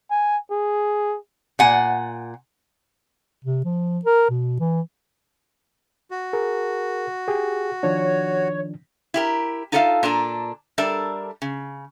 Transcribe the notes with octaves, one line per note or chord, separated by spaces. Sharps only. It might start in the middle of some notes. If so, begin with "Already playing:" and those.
G#5
G#4
A#2 F#5 G#5
C3
F3
A#4
B2
E3
F#4
G#4 A#4
G4 G#4
D#3 F3 D4 C#5
E4 G4 A#4
D#4 F4 A4 D5 E5 F5
A#2 D4 A4 A#5
G3 D4 A4 A#4 D5 E5
C#3